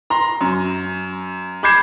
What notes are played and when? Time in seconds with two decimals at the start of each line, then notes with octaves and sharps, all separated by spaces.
0.10 A#5 C6
0.41 F#2
1.63 B5 D6 G6 G#6 C7 E7